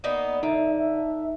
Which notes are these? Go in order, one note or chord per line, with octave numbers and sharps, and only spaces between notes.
A#3 B3 D#4 D5
D3 D#4 E5
E5